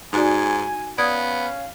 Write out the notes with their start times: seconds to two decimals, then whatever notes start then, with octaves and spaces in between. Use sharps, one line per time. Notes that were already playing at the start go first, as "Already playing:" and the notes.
0.13 G#2 D#4 F#4 D5 G#5
0.98 B3 C#4 D5 F5 D#6 G#6